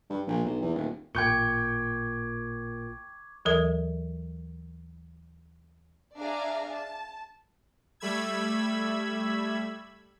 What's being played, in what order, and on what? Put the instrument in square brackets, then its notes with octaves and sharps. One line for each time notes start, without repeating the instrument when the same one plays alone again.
[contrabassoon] G2
A#1
B1
E2
D#1
[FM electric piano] A1 [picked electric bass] A#2 [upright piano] G5 G6 C#7 [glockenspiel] C#6 D6 G#6
[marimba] D#2 E3 F#3 A4 A#4 D#6
[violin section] D4 G#4 D5 E5 F5 A#5
A5
[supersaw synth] G3 A3 B5 E6 G#6